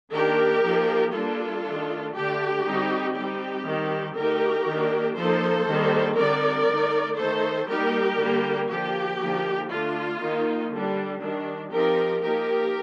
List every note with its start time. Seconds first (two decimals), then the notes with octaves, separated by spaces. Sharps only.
0.13 D#3 A#3 D4 G4 A#4
0.63 F3 A#3 D#4
1.14 G3 A#3 D4 F4 A4
1.64 D#3 A3 D4
2.15 D3 A3 D4 G4
2.65 D3 G3 C4 D#4
3.15 G3 C4 D#4 G4
3.66 D#3 G3 C4
4.15 D3 A3 D#4 G4 A#4
4.66 D#3 A#3 D4
5.16 F3 A#3 D#4 A4 C5
5.67 D#3 G3 A#3 D4
6.17 D3 G3 C4 D#4 A#4 D5
6.68 D3 A3 D#4
7.18 D#3 A3 D#4 A4 C5
7.69 G3 A#3 D#4 G4 A#4
8.19 D3 G3 A#3
8.69 D3 F3 A#3 G4
9.19 D3 F3 A#3 D#4
9.70 D3 A3 D4 F4
10.20 D#3 A#3 D#4
10.70 D3 G3 D4
11.21 D#3 G3 D4
11.71 F3 C4 D#4 G4 A#4
12.22 F3 A#3 D#4 G4 A#4